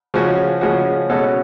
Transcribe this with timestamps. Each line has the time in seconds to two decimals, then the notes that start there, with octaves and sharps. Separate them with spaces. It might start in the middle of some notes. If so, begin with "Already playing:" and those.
0.14 C#3 F3 G#3 C#4 F#4
0.61 C#3 F3 G#3 C#4 F#4
1.09 B2 G#3 C#4 F#4 A4